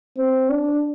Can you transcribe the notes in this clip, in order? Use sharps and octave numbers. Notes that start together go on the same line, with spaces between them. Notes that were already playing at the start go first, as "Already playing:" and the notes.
C4
D4